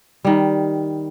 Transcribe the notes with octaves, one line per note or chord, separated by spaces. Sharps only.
D#3 G3